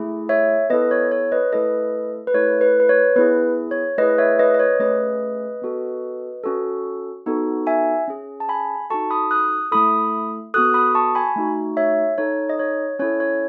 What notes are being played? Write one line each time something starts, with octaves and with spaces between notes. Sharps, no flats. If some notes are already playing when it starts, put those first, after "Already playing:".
Already playing: A3 E4 G#4
C#5 E5
B3 E4 A4 B4 D#5
C#5
C#5
B4 D#5
A3 E4 A4 B4 D#5
B4
A3 E4 A4 C#5
B4
B4
C#5
B3 E4 G#4 B4
C#5
A3 E4 G#4 B4 D#5
C#5 E5
B4 D#5
D#5
C#5
A3 C#4 G#4 B4 D#5
B3 F#4 A4
C#4 F#4 A4
B3 D#4 F#4 A4
E5 G#5
C#4 G#4
A5
G#5 B5
D#4 F#4 A4 A5 C#6
B5 D#6
D#6 F#6
A3 E4 A4 B5 D#6
B3 F#4 A4 D#6 F#6
B5 D#6
A5 C#6
G#5 B5
A3 D#4 F#4
C#5 E5
D#4 A4 C#5
D#5
C#5
C#4 E4 A4 C#5
C#5